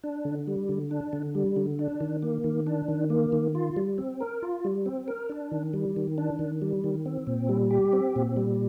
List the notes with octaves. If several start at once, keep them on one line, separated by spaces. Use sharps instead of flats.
D4
D3
G3
D3
D4
D3
G3
D3
D4
D#3
A#3
D#3
D4
D#3
A#3
D#3
F4
G3
C4
A#4
F4
G3
C4
A#4
D4
D#3
G3
D#3
D4
D#3
G3
D#3
C4
A#2
G3
G4
C4
A#2
G3